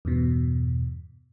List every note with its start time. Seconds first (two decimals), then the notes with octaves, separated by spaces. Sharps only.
0.05 E2 G2 B2